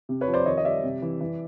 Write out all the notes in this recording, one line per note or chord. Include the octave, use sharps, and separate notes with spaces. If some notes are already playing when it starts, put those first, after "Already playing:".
C3
B4 C#5
F3
C5 D5
D#3 C#5 D#5
D#5
G3 D5 E5
C3
E3
E3